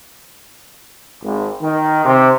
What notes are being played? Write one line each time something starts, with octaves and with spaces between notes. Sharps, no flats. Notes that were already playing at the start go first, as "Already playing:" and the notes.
G#1
D#3
C3